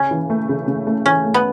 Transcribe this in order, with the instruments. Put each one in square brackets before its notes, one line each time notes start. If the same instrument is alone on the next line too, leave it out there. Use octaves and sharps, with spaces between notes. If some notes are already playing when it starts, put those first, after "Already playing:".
Already playing: [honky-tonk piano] C#3 [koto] C#4
[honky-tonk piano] E3
A3
C#3
C#3
A3
[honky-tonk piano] E3 [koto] C#4
[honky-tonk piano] A3
[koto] B3